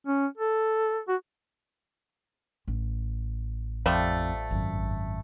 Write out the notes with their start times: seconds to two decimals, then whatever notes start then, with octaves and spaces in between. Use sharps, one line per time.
0.07 C#4
0.38 A4
1.08 F#4
2.68 A1
3.86 F2 F3 G3 A3
4.51 G#1 F#2